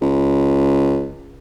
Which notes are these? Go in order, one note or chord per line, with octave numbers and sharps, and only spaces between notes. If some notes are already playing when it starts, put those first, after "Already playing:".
C#2